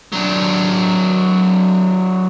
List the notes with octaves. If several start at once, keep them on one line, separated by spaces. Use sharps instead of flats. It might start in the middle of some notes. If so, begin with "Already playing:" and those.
F#3 D4